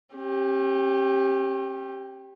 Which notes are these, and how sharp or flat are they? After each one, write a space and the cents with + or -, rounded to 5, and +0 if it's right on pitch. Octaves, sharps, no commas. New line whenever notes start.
C#4 -45 G4 +0